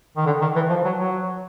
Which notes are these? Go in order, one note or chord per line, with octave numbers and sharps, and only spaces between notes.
D#3
D3
D#3
E3
F3
F#3
F#3